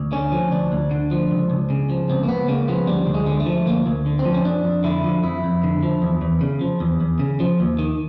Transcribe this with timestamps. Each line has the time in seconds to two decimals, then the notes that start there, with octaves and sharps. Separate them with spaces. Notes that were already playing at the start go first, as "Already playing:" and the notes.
Already playing: D2
0.12 D3 C#4
0.32 F3
0.51 D2 D4
0.72 D2
0.91 D3
1.11 F3
1.31 C#2
1.50 C#2
1.70 C#3
1.90 F3
2.10 C#2 C4
2.23 A#3
2.28 C#2 B3
2.48 C#3 A#3
2.68 F3 B3
2.87 D2 G3
3.07 D2
3.14 G#3
3.27 D3
3.40 A3
3.46 F3
3.66 D2 A#3
3.86 D2
4.06 D3
4.19 C4
4.25 F3
4.34 C#4
4.44 F2 D4
4.64 F2
4.84 D3 E4
5.04 F3
5.23 F2 E4
5.44 F2
5.63 D3
5.83 F3
6.02 E2
6.22 E2
6.41 C#3
6.61 F3
6.80 E2
7.01 E2
7.19 C#3
7.40 F3
7.60 D#2
7.79 D#3